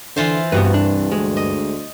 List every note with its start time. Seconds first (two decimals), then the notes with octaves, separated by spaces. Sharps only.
0.16 D3 E3 F4 C5
0.52 C2 G2 B3 F#4 B4
0.74 D4
1.12 D2 G#3
1.37 D#5